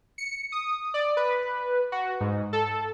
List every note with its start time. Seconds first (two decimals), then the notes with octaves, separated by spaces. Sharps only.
0.18 C#7
0.52 D#6
0.94 D5
1.17 B4
1.92 F#4
2.21 G#2
2.53 A4